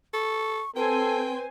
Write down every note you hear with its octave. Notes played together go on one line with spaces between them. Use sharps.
A4 C#6
C4 A4 B4 C5 G5 G#5